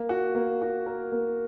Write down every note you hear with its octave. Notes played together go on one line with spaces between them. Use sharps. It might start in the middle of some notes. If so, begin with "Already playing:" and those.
Already playing: A#3
F#4
A#3
F#4
A#4
A#3